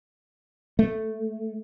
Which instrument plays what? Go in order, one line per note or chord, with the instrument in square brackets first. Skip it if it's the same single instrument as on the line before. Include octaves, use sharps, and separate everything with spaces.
[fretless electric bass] A3